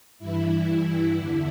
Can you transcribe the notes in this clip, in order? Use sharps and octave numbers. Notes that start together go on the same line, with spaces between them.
G2 E3 E4
E2 D3 E4